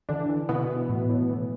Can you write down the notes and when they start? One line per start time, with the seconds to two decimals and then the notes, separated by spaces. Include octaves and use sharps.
0.09 D3 E3 D4
0.29 E3
0.49 B2 E3 B3
0.70 E3
0.89 A2
1.09 A2
1.29 E3